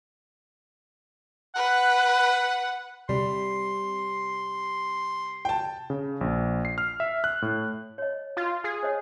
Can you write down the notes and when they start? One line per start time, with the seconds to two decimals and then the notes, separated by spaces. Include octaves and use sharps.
1.56 B4 F#5
3.09 C3 G3 C6
5.45 G5 A5
5.90 C#3
6.21 A#1
6.65 C7
6.78 F6
7.00 E5
7.24 F#6
7.42 A2
7.98 C#5 D#5
8.37 F4
8.64 G#4
8.83 C5 C#5 D#5